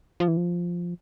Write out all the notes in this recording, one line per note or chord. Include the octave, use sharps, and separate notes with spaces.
F3
E3
F3